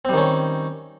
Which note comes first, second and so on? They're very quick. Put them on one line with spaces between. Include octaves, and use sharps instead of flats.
C4 G3 D#3 C#4